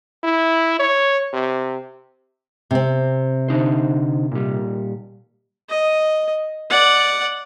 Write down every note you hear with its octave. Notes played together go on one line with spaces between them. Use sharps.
E4
C#5
C3
C3 C4
D3 D#4 C5
A#2 G3
D#5
D5 F#5